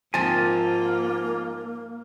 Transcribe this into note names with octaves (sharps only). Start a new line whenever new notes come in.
G#2 F3 A#3 C4 F4 G#5 A5